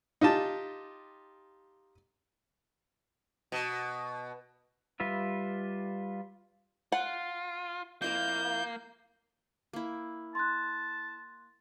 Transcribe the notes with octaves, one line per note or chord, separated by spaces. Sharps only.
D#4 F4 G4 A5
B2
G3 F4 B4 E5
F4 F#5
F2 A#3 E4 F5 G6
A#3 E4
A5 C6 F#6